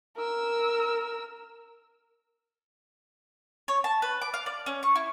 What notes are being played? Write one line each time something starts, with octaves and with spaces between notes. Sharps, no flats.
A#4 E6
C#5
A5
B4
D6
F5
D5
C#4
C#6
E4